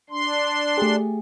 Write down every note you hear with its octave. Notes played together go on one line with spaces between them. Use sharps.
D4 C6
A3 G4 G#4